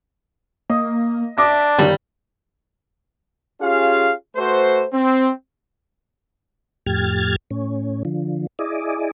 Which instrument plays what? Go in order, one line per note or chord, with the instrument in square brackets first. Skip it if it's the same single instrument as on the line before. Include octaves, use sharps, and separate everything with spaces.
[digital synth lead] A#3 [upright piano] D#5
[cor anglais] D4 [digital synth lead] E5 [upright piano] D6 A#6
[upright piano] G1 D#3 [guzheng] G3 [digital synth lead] E6
[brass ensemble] C#4 F4 G4 G#4 F5
A3 F#4 B4 C5
C4
[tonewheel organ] F2 A2 G4 F6 G#6 A6
A2 C#4
D3 F3
E4 G#4 D5 D#5